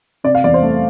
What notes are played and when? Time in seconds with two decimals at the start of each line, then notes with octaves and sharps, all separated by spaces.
0.24 C3 D5
0.35 F5
0.44 E2 D5
0.54 C5
0.63 A3